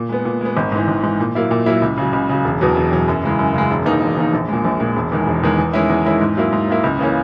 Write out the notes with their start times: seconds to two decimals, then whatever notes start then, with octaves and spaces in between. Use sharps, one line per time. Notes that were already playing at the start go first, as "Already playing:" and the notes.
Already playing: A#2
0.09 G#3 B3
0.25 A#2
0.41 G#3 B3
0.57 G#1
0.72 G#2 E3
0.88 G#1
1.03 G#2 E3
1.20 A#2
1.35 F#3 A#3 E4
1.51 A#2
1.66 F#3 A#3 E4
1.82 C#2
1.98 C#3 F#3
2.13 C#2
2.29 C#3 F#3
2.45 E1
2.61 E2 B2 F#3
2.77 E1
2.92 E2 B2 F#3
3.08 F#2
3.23 C#3 E3 G#3
3.39 F#2
3.54 C#3 E3 G#3
3.71 E1
3.85 E2 D#3 A#3 D#4
4.01 E1
4.17 E2 D#3 A#3 D#4
4.33 A#1
4.48 A#2 G#3
4.65 A#1
4.80 A#2 G#3
4.96 E1
5.12 E2 D#3 G#3
5.27 E1
5.43 E2 D#3 G#3
5.58 E2
5.73 D#3 G#3 C#4 E4
5.89 E2
6.05 D#3 G#3 C#4 E4
6.21 G#2
6.37 F#3 A#3 E4
6.52 G#2
6.68 F#3 A#3 E4
6.84 C#2
6.99 C#3 E3 A#3 C#4